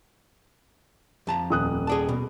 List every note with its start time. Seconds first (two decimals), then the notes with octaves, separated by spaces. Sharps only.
1.27 F2 A5 A#5
1.50 D#1 D#6 F#6
1.87 G#4 D5 A5
2.09 B2